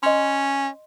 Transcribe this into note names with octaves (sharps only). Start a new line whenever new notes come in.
C#4 D#5 C6